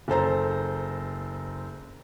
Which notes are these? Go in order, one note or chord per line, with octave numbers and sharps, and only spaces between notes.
F#1 A4 C5 A#5